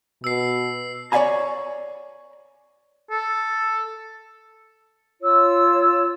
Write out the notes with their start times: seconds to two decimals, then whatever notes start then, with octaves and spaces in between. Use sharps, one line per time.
0.24 B2 E6 C7
1.12 C#5 D5 E5 F5 G#5 A#5
3.11 A4
5.21 F4 C#5 E6